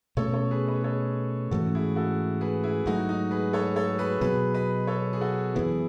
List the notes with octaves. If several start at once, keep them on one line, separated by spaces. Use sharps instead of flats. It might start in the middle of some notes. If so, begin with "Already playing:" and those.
B2 A3 C#4 A4 C#5
A4 C#5
G#4 B4
B4 D#5
A4 C#5
G#2 E3 A3 C#4 F#4 A4
E4 G#4
F#4 A4
G#4 B4
E4 G#4
G#2 F#3 A3 D#4 F#4
D#4
G#4 B4
A4 C#5
A4 C#5
G#4 B4
B2 F#3 B3 G#4 B4
B4 D#5
A4 C#5
G#4
F#4 A4
F#2 E3 B3 E4 G#4